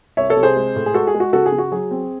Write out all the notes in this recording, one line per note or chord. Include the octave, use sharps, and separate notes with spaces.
C2 C#5 E5
A4 C#5
C3
G#4 C5
G#3
A2
G#4
G#3 F#4 A4
G#4
G#3
F#4
C#3 F#4 A4
G#4
C#3
F#4
F#3 G#4
C4